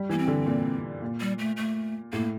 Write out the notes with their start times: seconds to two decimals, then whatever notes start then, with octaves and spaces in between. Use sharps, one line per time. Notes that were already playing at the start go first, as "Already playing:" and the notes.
Already playing: G3
0.09 E3 A#3
0.18 C4
0.28 D3
0.46 A#2
1.02 A#2
1.20 G3
1.39 A3
1.57 A3
2.13 A2 A#3